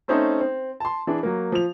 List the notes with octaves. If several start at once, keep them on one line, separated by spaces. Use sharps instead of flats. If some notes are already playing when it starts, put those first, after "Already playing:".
A3 C4 C#4 D#4 A4 C5
C4
A5 C6
E3 D4 G#4
F#3 A#3
F3 F7